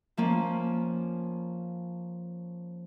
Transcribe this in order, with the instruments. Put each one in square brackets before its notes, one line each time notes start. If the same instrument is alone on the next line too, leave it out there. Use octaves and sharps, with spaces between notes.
[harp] F3 A#3 C#4